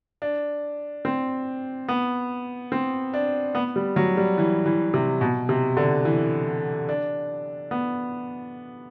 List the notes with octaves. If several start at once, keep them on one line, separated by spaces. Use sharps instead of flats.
D4
C4
B3
C4
D4
B3
G3
F#3
G3
E3
E3
C3
B2
C3
D3
E3
D4
B3